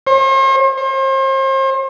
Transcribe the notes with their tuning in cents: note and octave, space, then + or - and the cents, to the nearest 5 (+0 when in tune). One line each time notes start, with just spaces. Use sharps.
C5 +45
C5 +40